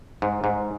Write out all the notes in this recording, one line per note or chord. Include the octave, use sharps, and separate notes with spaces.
G#2
G#2